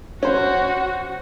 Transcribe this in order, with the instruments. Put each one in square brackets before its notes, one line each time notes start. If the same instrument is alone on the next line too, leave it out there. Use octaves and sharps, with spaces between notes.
[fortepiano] C#4 C5 [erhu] F#4